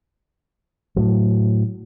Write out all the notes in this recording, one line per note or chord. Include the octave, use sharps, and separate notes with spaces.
A2 F#3